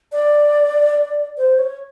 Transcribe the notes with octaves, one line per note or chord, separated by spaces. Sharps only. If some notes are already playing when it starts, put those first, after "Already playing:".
D5
C5
C#5